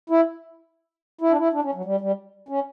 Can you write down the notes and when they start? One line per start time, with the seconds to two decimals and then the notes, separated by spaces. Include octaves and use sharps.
0.10 E4
1.21 E4
1.30 D4
1.37 E4
1.53 D4
1.63 C#4
1.75 F#3
1.85 G3
2.01 G3
2.49 C#4